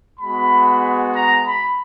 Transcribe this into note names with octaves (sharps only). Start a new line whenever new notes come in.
G#3 B3 F#4 B5
A#5
B5